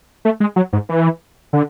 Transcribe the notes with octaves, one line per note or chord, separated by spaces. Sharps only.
A3
G#3
F#3
G#2
E3
D3